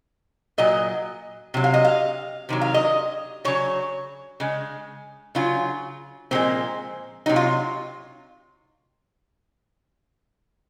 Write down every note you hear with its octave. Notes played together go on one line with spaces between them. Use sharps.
A#2 F#3 D#5
C3 F#3
F5
D#5
F5
C3 D#3 F#3
F5
D#5
C#3 F#3 C#5
C#3 G#3
C#3 F#3 F4
A#2 F3 G#3 C4
C3 F#3 D#4
F4